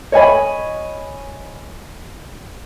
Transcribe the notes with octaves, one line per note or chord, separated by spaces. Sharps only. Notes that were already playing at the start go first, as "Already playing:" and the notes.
C#5 D#5 G#5 B5